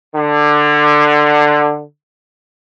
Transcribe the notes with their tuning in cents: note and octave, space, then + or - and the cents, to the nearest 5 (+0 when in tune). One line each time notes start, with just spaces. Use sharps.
D3 +15